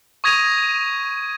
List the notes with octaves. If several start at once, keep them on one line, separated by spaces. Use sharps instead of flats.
C#6 D#6 G#6 A#6 D#7 F7